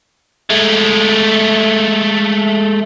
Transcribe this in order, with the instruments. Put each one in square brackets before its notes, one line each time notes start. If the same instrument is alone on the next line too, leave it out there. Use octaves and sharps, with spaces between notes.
[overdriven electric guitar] G#3 A3